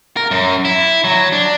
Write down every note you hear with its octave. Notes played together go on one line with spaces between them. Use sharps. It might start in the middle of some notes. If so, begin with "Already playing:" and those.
A#4
F#2
E4
F#3
D4